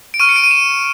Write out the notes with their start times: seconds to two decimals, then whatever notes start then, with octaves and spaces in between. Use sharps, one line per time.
0.14 D7
0.20 C#6 F6 D#7
0.29 C#7
0.36 D7
0.44 D#7
0.51 E7